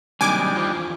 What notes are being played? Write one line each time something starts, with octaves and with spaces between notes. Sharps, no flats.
C3 D#3 F#3 G3 A#3 D4 G#5 D6
E2 F4 C5